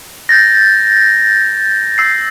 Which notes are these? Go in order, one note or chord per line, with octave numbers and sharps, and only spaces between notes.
G6 A6 A#6
E6 C7